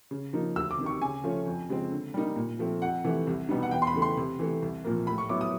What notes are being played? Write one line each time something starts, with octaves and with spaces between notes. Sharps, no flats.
C#3
F3 A#3 D#4
D2 E6
D6
C3 D#3
C#6
C#3 G#5
F3 A3 C#4 F4
F2
C#3 F3 G#3 C4
D3
G3 A#3 D#4
A#2
F3 A3 C4
F2 F#5
C3 E3 A3
C2
B2 G3 B3 D#4
F#5
E2 G5
C6
B5
C#3 E3 A3
C6
C3
E3 A3
C2
A#2 F3 A#3
A2 B5
C#6
F#3 B3 E4 D6
D#6